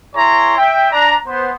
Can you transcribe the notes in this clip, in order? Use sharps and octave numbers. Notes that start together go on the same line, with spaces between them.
E4 G#4 C#5 A#5 C6
E5 G5
D4 A#5
B3 C5